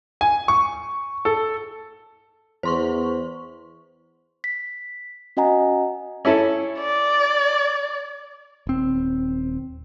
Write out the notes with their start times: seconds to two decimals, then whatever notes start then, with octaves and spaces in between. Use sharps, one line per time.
0.21 G#5
0.48 C#6
1.25 A4
2.63 E2 C5 C6 C#6
4.44 B6
5.37 C#4 F#4 D#5 F#5 G#5 A#5
6.25 C#4 E4 A4
6.80 D5
8.67 D#1 C4